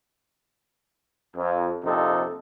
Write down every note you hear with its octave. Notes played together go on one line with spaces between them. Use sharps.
F2
A#1 F2 C3 D#4 A4